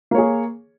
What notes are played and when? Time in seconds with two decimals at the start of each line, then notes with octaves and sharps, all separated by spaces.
0.11 A#3
0.15 C#5
0.18 G#4